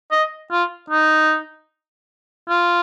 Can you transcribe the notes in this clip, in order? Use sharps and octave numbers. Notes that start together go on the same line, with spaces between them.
D#5
F4
D#4
F4